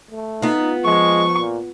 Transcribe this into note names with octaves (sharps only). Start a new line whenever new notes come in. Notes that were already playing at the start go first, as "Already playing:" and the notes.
A3
B3 D#4 F4
F3 G#3 C#6
A#2